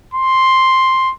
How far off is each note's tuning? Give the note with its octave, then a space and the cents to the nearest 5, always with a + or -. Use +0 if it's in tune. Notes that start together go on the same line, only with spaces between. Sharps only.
C6 +5